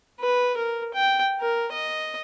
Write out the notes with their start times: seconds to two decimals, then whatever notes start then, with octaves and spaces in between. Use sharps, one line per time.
0.20 B4
0.57 A#4
0.94 G5
1.40 A#4
1.73 D#5